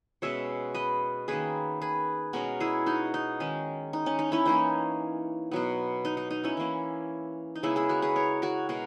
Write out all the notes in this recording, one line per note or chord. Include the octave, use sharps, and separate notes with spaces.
B2 G#3 C#4 C#5 E5
B4 D#5
D#3 A#3 C#4 G#4 B4
G#4 B4
B2 G#3 C#4 F#4 A#4
E4 G#4
D#4 F#4
D#4
D#3 G#3 C#4
D#4
C#4
D#4
C#4 E4
E3 A#3 C#4 D#4
B2 F#3 B3
D#4
D#4
D#4
C#4 E4
E3 A#3 C#4
D#4
C#3 G#3 B3 C#4 E4
E4 G#4
F#4 A#4
G#4 B4
A#4 C#5
F#4 A#4
B2 G#3 F#4 A#4